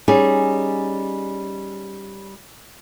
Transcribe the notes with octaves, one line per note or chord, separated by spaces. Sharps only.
G3 C#4 D#4 G#4